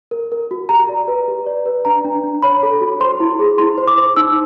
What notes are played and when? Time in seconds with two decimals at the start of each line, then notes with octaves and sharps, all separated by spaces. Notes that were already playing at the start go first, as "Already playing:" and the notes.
0.11 A#4
0.32 A#4
0.51 F#4
0.69 G4 A#5
0.89 D5
1.08 B4
1.28 G4
1.46 D5
1.66 B4
1.85 D4 A#5
2.05 D4
2.23 D4
2.42 C#5 B5
2.63 A4
2.81 F#4
3.00 C5 C6
3.20 E4
3.39 G#4
3.58 E4 C6
3.78 C5
3.87 D6
3.98 C5
4.16 D#4 E6